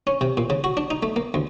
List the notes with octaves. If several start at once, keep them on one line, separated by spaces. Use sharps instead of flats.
C#4
C3
A#2
C#3
F#4
D4
D#4
A3
A#3
D2